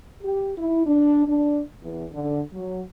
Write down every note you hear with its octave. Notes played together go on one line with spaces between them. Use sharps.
G4
E4
D4
D4
E2
D3
F#3